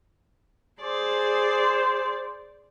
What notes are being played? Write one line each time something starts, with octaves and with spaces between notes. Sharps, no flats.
G#4 C5 D5